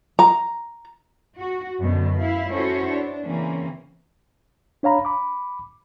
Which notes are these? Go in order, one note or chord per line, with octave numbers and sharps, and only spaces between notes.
A#5
F#4
F#2 B2 D3
E4 F5
C#4 E4 F#4 A4 C5 C#5
D4
C#3 E3 A#3 C4 C#4
D4 C#5 F5 A#5 B5
B5 D6